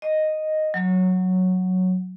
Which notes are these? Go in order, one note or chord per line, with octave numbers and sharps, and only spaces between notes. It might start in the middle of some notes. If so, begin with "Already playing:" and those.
D#5
F#3